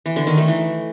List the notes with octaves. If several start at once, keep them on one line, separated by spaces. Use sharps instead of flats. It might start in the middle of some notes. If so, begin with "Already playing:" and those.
E3
D3
D#3
A3
E3